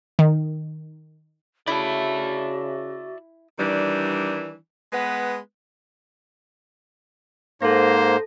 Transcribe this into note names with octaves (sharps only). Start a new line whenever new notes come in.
D#3
C#3 E4 F#4 D5 E5 A5
D#3 E3 G3 D4
G#3 B3 B4
G#2 A#3 A4 C5 A#6